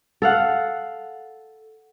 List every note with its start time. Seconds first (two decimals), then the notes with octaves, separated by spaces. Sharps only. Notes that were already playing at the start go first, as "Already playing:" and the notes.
0.22 A4 F5 F#5